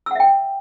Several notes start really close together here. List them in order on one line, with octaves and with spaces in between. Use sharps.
E6 F#5 E5 G5